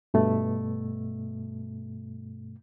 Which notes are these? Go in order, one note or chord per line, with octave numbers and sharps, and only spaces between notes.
G2 B2 A3